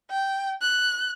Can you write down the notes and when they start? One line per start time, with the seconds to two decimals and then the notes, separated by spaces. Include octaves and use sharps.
0.10 G5
0.61 F#6